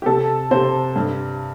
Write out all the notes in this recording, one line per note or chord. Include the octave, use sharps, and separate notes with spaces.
G4
C3 A4
C3 C5
G2